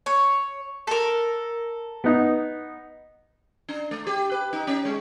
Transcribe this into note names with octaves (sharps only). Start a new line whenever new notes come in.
C#5
A4 A#4
B3 D#4
D4
A3
G4
B4
D#4
C#4
G#3